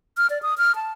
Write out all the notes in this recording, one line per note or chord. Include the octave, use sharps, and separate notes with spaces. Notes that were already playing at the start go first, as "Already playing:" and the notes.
F6
D5
D#6
F6
A5